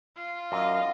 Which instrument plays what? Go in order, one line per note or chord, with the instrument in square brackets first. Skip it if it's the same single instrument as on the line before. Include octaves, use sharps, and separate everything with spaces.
[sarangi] F4
[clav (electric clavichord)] F#2 [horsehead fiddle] D#5 F5